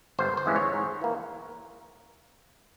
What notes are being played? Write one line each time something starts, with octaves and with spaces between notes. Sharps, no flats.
G1 C5
C5
F2 E3 G#3 C#4
C#5
G#2
E3 A#3